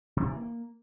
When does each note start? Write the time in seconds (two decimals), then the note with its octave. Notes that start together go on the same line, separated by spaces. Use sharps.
0.17 C3
0.27 E3
0.37 A#3